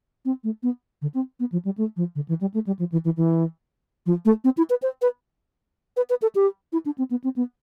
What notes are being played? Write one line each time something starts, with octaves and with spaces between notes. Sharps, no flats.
C4
A3
B3
D3
C4
B3
F3
G3
A3
F3
D3
E3
G3
A3
G3
F3
E3
E3
E3
F3
A3
C4
E4
B4
C5
B4
B4
B4
A4
G4
E4
D4
C4
B3
C4
B3